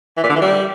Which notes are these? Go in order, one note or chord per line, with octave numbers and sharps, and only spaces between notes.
E3
A#2
D3
E3
G3